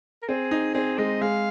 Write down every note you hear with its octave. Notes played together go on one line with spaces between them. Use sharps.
A#4
C4 G#4
D#4
C4 G#4
G#3 D#5
G#3 F5